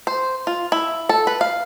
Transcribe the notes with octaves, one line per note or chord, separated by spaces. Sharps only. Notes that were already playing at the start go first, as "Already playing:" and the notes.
C5
F4
E4
A4
B4
F5